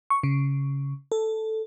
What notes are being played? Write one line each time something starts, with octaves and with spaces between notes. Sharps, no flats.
C#6
C#3
A4